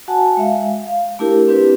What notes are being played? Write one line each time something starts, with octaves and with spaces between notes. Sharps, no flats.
F#4 F#5 G#5 A5
G#3 E5 F5
F5
A3 D4 E4 G4 A#4
C4 D4 E4 G4 B4